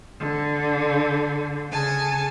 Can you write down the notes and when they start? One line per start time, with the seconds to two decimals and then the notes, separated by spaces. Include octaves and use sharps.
0.20 D3
1.71 C#3 G#5 A5